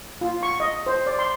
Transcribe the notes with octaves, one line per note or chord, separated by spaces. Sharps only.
F4
C#6
D#5
C5
D5
C6